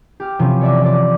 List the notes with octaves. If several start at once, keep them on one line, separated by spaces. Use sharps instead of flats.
G4 F6
C3 E3 F3 C#4
C#5 D5 E5
F4 D5